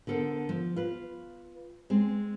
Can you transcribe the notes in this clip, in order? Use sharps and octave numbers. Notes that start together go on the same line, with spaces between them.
D3 B3 A4 A#4 C5
F3
F4 B4
G#3 C4